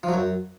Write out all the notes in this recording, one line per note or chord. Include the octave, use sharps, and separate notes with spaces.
F3
F#3
F#2